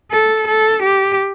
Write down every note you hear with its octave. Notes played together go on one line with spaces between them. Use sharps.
A4
A4
G4